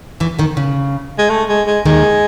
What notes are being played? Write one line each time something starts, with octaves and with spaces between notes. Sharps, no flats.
E2 E3
D#2 D#3
C#3
G#3
A3
G#3
G#3
D#2 D#3 G#3